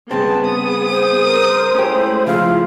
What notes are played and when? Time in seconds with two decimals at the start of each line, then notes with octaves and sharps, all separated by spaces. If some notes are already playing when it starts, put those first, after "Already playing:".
0.11 G2 C#3 B3 C4 G#4 A5
0.45 D#6
0.90 C5
1.25 A#4
1.74 G#3 A3 C#4 E4 G4
2.27 C#3 F3 F5